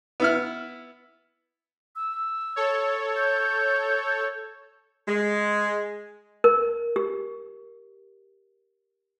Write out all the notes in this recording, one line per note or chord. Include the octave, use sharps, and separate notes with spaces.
B3 E4 F6
E6
A4 C#5
G6
G#3
A#4
G4